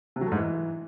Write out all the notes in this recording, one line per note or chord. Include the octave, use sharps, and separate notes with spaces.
C3
F#3
A3
G#2
E3